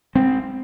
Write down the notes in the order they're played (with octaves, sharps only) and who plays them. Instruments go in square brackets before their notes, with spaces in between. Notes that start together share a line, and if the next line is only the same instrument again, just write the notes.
[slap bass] G#3 C4